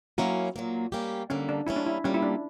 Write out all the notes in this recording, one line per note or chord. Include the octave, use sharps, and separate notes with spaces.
F#3 A#3 C#4 E4 F#4 A#4
A#2 F#3 A#3
G3 A#3 C#4 G4
G2 D3 G3 A#3 C#4
D4
G3 A#3 C#4 E4
D4
E4
A#2 G3 A#3 C#4
E4
D4